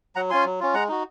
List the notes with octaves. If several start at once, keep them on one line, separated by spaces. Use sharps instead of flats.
F#3 F#5 A#5
C#4 F4 G#5 C6
F#3
C#4 F4
G#3 F#5 A#5
D#4 F#4